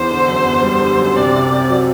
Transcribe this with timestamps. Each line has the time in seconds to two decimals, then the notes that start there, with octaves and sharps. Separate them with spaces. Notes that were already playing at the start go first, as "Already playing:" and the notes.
Already playing: E2 C5
0.11 D3
0.28 F#2
0.45 B3
0.63 G3
0.81 D3
0.98 F#2
1.16 C3 D5
1.35 C2
1.52 C4
1.70 F#3